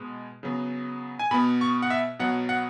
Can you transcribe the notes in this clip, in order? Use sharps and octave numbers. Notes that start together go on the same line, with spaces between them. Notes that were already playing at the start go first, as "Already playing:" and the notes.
Already playing: B2 G#3 B3
C#3 F#3 B3
G#5
B2 B3 B5
C#6
F#5
E5
B2 F#3 B3 F#5
F#5